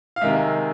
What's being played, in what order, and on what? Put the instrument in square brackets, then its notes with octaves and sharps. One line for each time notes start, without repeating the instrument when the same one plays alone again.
[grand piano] F5
C3 D#3 G#3 E5